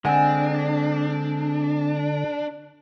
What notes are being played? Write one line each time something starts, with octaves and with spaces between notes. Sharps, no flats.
D3 G#3 C4 D4 F#5 G#5